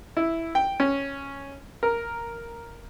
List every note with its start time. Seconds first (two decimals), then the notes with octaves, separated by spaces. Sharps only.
0.17 E4
0.55 G5
0.80 C#4
1.83 A#4